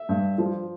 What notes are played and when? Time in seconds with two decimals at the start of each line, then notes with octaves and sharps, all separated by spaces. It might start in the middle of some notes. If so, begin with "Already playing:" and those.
Already playing: E5
0.09 G2
0.38 F3